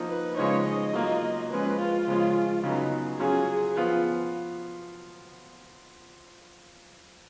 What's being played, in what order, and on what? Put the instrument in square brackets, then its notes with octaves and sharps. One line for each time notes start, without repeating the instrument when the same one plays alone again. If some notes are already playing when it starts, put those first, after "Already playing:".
Already playing: [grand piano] F3 A#3 D#4
[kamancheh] B4
[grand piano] C#3 F3 G#3 D#4 [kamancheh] C#5
[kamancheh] D#5
[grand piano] F#3 A#3 F4
[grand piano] F3 G#3 C#4 [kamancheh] B4
[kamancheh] F4
[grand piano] C#3 F3 G#3 C#4
[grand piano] C#3 F#3 B3 [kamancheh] D#4
[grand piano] F#3 C#4 F4 [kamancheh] G#4
[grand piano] F3 B3 F4